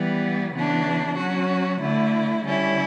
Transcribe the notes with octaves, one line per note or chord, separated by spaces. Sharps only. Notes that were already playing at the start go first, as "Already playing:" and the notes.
Already playing: E3 G3 B3
C#3 E3 B3 D4
F#3 C#4 F#4
D3 A3 E4
D3 G3 C#4 E4